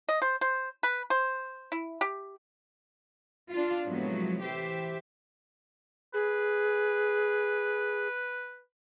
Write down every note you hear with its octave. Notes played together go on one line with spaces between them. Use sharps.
D#5
C5
C5
B4
C5
E4
G4
D4 F4
A2 C3 F3 F#3 G#3 B3
E3 G4 C5 E5
G#4 B4